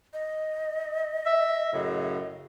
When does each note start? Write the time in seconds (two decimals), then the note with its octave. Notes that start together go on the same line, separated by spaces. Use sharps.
0.13 D#5
1.25 E5
1.73 F#2 A2 C#3